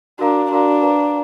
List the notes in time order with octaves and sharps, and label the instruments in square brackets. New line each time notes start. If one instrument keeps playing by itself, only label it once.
[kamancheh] D4 [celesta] F#4 A#4 F5 A#5
[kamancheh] D4 [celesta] F#4 A#4 F5 A#5
[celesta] B4 F5 A#5